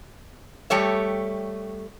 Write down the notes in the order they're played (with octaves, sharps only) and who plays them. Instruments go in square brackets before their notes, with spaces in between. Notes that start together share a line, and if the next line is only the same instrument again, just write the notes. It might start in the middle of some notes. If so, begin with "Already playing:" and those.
[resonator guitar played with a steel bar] G3 A3 G4 C#5 E5